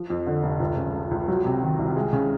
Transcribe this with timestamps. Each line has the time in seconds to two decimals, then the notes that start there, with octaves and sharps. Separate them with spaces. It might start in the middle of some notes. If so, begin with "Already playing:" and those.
Already playing: F3
0.10 F2
0.26 D3
0.43 F1
0.60 C#2
0.77 C#3
0.94 F3
1.11 C#2
1.28 F#3
1.45 C3
1.63 D#3
1.79 C2
1.96 G#3
2.13 C#3